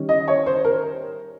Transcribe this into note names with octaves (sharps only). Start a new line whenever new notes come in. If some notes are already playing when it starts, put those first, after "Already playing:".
Already playing: D#3 G3 C#4
D#5
C#5
C5
A#4